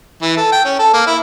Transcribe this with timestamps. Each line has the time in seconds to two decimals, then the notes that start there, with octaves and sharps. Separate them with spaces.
0.22 E3
0.37 A4
0.52 G5
0.65 C#4
0.79 A4
0.93 A#3
1.07 E4